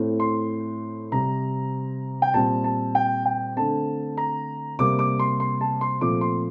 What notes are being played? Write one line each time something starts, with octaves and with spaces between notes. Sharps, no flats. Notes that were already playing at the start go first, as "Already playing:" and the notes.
Already playing: A2 A3 C4
C6
C3 G3 C4 A#5
G5
A#2 G3 C4 A5
A5
G5
G5
D3 A3 C4 A5
A#5
C3 G3 A#3 D6
D6
C6
C6
A5
C6
A#2 F3 A3 C4 D6
C6